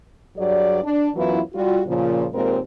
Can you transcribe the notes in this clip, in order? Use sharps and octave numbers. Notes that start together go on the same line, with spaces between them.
G2 F#3 G#4 D5
D4
F#2 E3 F#3 B3 E4 F4
G3 F4 F#4
A#2 C#3 F3
D#2 A#2 G#3 C4 A#4